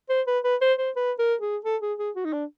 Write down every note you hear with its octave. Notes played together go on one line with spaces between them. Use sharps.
C5
B4
B4
C5
C5
B4
A#4
G#4
A4
G#4
G#4
F#4
D#4
D4